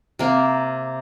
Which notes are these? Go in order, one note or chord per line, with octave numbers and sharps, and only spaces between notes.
C3 A#3